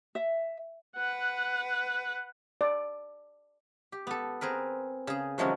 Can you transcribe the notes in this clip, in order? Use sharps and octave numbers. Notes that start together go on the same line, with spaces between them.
E5
B4 F#5
D5
G4
B3 A4
C4 G#4 A#4 B4
C#3 G#4
C3 D#3 F3 F#3 G#3 C#4